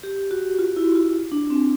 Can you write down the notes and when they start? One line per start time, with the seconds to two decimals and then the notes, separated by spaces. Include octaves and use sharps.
0.03 G4
0.31 F#4
0.59 F4
0.76 E4
0.95 F4
1.32 D4
1.50 C4